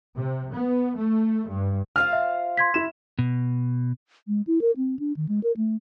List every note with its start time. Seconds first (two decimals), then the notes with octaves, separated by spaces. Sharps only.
0.15 C3
0.53 B3
0.95 A3
1.47 G2
1.96 F4 C5 F5 F6
2.13 E5
2.57 C6 G#6 B6
2.74 E4 E7
3.19 B2
4.28 G#3
4.47 E4
4.61 A#4
4.77 C4
4.99 D4
5.17 D#3
5.29 G#3
5.43 A#4
5.57 A3